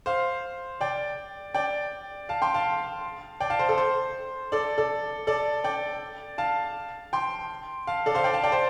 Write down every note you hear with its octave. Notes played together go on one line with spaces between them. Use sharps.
C5 F5
D5 G5
D5 G5
F5 A5
G5 C6
F5 A5
D5 G5
F5 A5
C5
A4
C5
A4 D5
A4 D5
A4 D5
D5 G5
F5 A5
G5 C6
F5 A5
A4 D5
C5 F5
D5 G5
F5 A5
D5 G5
C5